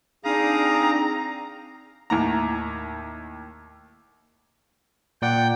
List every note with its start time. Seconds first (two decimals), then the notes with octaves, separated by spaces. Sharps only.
0.25 C4 D4 D#4 G#4 F5 G5 A#5 D#6
2.10 D#2 A2 A#5
5.22 A#2 D5 F#5 G5